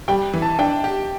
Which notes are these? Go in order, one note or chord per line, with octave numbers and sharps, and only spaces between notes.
G3 G5
E3
A5
D4 G5
G4